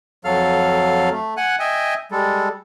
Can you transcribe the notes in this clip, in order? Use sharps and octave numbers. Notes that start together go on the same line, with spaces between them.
F2 F#3 A4 F5 F6
A3
F#5 G#5 F#6
D#5 E5 G5 G#5
G3 G#3 A4